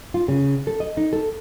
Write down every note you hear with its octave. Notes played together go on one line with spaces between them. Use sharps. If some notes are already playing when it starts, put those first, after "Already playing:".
F4
C#3
A4
D#5
D#4
A4